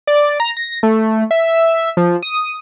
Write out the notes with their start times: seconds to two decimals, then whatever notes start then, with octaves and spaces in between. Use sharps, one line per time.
0.07 D5
0.40 A#5
0.57 A#6
0.83 A3
1.31 E5
1.97 F3
2.23 D#6